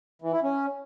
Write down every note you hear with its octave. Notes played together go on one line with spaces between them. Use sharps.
E3
E4
C#4